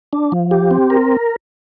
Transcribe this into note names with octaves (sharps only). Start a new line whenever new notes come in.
D4
F3
G4
C4
A#4